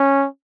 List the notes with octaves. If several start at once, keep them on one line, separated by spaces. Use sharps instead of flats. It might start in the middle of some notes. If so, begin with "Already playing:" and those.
Already playing: C#4